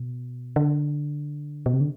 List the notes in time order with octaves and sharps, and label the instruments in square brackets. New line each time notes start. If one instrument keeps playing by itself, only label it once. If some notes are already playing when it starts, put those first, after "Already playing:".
Already playing: [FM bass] B2
D3
B2
C3
D3